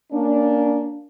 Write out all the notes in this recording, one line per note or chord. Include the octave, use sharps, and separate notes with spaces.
A#3 C#4 D4